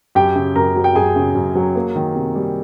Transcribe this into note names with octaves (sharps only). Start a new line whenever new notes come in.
F#2 G4 G5
C#3
F#2 A#4 A#5
F#3
G5
F#2 G#4 G#5
C#3
F#2
F#3
A#3
D#3
C3
G3